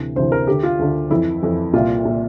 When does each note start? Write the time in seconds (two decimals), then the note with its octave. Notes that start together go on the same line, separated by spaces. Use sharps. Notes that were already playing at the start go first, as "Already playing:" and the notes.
Already playing: D2 C3 E3
0.16 D2 C3 E3 C5
0.32 A#4
0.47 D2 D3 G4
0.63 F4
0.79 D2 D3
1.10 F2 E3 E4
1.43 F2 E3
1.74 C2 A#2 F4
2.05 A#2